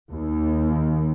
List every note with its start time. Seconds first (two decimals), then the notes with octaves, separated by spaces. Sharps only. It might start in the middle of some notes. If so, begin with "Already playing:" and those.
0.11 D#2